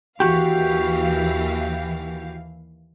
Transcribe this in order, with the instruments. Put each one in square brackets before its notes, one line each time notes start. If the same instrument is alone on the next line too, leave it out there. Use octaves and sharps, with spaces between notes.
[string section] D#2 E3 F5 [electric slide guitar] F#4 G4